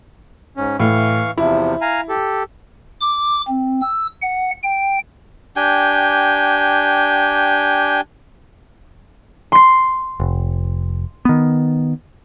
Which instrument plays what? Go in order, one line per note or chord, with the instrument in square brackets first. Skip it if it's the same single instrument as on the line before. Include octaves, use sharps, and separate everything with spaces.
[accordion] G#2 C#4
[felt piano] A2 [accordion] E3 F5 C#6
[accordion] E2 C3 F3 [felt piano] E4
[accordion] F5 G#5 A#5
G4 A4
[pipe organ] D6
C4
E6
F#5
G5
[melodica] D4 G4 G5 G#5
[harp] C6 C7
[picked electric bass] F1
D#3 B3